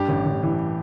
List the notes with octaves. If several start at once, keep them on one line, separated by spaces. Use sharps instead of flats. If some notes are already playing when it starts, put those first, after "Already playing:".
Already playing: G2 G4
A1
A1
E3